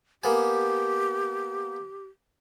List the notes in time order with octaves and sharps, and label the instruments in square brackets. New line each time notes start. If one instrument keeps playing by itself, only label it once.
[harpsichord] A#3 B3 G#5 [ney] G4